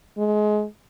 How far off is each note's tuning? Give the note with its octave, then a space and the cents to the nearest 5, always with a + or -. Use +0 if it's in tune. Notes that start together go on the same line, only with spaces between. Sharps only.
G#3 +25